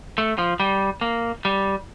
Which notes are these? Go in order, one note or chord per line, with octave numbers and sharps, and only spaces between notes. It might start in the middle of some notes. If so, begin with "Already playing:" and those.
A3
F3
G3
A#3
G3